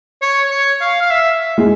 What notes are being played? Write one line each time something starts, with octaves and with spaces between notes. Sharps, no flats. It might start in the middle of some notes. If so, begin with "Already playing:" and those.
C#5
C#5
F5
F5
E5
G#3